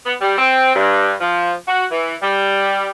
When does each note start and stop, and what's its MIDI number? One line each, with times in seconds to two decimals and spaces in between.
0.06 0.15 59
0.21 0.36 55
0.38 0.72 60
0.75 1.12 43
1.21 1.53 53
1.68 1.85 66
1.91 2.14 52
2.22 2.89 55